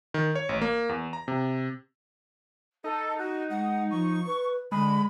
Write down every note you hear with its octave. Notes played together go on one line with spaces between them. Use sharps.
D#3
C#5
A1
A#3
E2
A#5
C3
D#4 A4
F#4
G#3 F#5
F3 C#6
B4
D3 G#3 B5